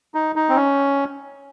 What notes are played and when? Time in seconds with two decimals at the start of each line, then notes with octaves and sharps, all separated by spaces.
0.14 D#4
0.36 D#4
0.49 C4
0.56 C#4